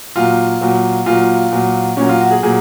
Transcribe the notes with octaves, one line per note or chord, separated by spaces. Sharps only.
A#2 F#3 F4
A#2 F#3
A#2 F#3 F4
A#2 F#3
A#2 F#3 C#4
F4
F#4
G#4
A#2 F#3 G#4